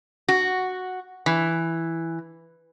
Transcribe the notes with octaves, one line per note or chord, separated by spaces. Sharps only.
F#4
E3